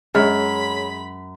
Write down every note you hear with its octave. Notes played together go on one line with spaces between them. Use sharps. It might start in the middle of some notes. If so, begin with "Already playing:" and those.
F#2 G#3 G#4 C#5 B5